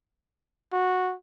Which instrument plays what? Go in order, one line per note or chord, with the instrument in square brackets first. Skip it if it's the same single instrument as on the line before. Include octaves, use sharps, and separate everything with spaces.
[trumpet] F#4